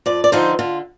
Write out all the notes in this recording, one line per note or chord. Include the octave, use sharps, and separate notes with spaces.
F2 D5
D5
D3 F3 C4 D#4 C5
D3 F4